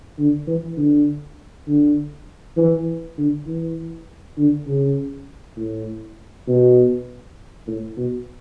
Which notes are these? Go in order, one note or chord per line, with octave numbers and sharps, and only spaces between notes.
D3
E3
D3
D3
E3
D3
E3
D3
C#3
A2
B2
A2
B2